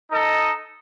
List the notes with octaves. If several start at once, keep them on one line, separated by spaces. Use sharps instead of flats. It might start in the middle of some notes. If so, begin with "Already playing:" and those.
D#4 A4 D#5